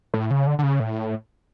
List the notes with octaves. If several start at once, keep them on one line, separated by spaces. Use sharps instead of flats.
A2
C#3
D3
D3
C#3
A2